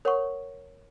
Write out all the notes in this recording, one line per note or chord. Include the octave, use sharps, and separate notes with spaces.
A#4 C#5 F#5 C#6